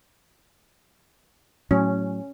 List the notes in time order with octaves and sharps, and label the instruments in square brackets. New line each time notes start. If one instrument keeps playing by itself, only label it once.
[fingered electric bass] A2 F#3 [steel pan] C#4